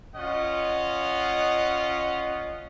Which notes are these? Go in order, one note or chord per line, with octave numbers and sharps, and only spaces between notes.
C#4 F4 D#5 F#5